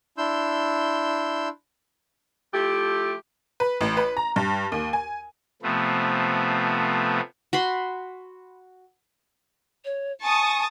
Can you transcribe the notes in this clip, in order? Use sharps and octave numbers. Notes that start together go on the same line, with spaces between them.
D4 E4 C6 E6 G6
F3 A3 E4 G4
B4
A1
B4
A#5
G2
D#2
G#5
C3 F3 A3 B3
F#4 B5 C6
C#5
G#5 A5 C#6 D#6